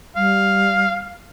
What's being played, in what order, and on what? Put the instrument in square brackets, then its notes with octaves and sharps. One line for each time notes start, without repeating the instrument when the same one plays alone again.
[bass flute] G3 [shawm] F5